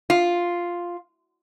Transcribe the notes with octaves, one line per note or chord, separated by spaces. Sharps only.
F4